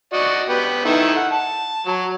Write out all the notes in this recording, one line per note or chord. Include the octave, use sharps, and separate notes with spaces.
F#4 D5 D#5
B3 G4
D#3 E4 A4
F#5
A5
F#3